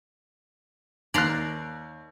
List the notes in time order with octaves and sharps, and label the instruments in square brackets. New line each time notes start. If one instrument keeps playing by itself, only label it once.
[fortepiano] D#2 F#6 [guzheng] D5 A#5 C6